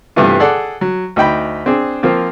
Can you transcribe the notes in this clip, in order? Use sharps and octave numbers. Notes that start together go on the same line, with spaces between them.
G2 C3 E3 A3 B3 F4
G#4 A4 D5 F#5
F#3
D2 D#4 G5 B5
C4 D4 G#4
F3 A#3 C4 F4